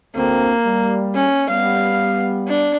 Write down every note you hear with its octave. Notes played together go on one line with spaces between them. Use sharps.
D2 A#3 C4
G3
C#4
G3 B3 F5
D4